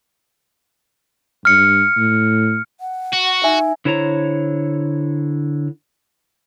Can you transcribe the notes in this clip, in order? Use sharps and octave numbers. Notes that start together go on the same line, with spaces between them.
G2 F6 C#7
A2
F#5
F#4
D#4 E5 G#5
D3 E4 C5 C#5 A#5